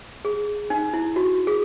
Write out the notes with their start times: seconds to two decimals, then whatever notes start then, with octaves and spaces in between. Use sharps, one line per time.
0.25 G#4
0.70 D#4
0.94 E4
1.16 F#4
1.47 G#4